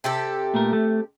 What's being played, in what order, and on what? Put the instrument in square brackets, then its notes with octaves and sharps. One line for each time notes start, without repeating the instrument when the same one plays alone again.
[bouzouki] C3 G4 A4
[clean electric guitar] A#2 A3 A#4
A3